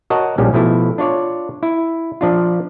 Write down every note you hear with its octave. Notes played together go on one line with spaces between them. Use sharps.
F#4 A#4 C#5 D#5 F#5 A5
A#1 F3 G3 C#4
B2 F3 A3 E4
D4 F4 C#5 D5
E4
F3 D4 F4